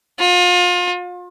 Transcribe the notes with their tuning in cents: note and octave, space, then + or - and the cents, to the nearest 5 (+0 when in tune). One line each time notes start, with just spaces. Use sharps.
F4 +35